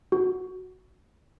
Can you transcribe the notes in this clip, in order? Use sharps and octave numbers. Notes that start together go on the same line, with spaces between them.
F#4